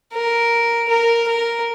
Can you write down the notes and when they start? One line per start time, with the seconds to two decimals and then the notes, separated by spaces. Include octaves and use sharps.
0.13 A#4
0.89 A#4
1.27 A#4